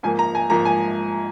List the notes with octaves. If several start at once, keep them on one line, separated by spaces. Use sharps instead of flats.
G#2 F3 A#3 G#5
A#5
G#5
G#2 F3 A#3 A#5
G#5